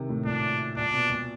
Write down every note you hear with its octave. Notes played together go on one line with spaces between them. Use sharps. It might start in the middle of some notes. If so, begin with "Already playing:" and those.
Already playing: C3 D#3
A2
A#2 D4
A#2 D4
B2
A#2